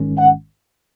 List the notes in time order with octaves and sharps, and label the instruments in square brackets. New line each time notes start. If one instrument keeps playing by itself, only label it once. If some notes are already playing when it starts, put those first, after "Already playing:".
Already playing: [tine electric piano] G#1 G#2 D#3 G#3 C#4
[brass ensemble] F#5